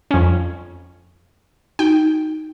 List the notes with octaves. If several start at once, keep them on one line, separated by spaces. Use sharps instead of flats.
F2 C#4
D#4 F#4 G5